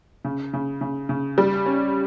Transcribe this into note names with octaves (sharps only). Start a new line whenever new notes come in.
C#3
C#3
C#3
C#3
G3
C#4